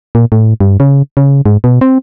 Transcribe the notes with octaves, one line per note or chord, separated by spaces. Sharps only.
A#2
A2
G2
C#3
C#3
G#2
B2
C4